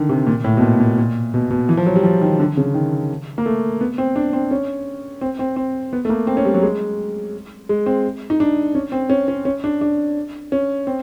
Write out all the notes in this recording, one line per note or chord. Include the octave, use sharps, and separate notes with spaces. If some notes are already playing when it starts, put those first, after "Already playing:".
Already playing: D3 D#3
C3
A#2
A2
B2
A#2
A#2
A#2
B2
B2
E3
F3
F#3
G3
F3
D#3
D3
C#3
D#3
A#3
A3
B3
C4
D4
C4
C#4
C4
C4
C4
B3
A3
A#3
C4
C#4
G3
F#3
G#3
G#3
C4
D#4
D4
C#4
C4
C#4
C#4
C#4
D4
D4
C#4
C4